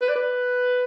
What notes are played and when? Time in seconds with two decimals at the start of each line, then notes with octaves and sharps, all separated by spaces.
0.01 B4
0.09 D5
0.15 B4